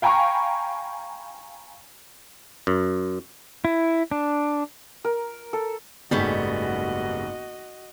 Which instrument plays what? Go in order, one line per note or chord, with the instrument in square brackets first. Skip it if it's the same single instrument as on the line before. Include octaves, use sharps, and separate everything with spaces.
[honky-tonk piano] F5 G5 G#5 A#5 B5 C#6
[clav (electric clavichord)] F#2
[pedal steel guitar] E4
D4
[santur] A#4
A4
[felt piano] F#1 B1 G#2 [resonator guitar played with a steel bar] G3 A3 B3 [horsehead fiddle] F#4 D#5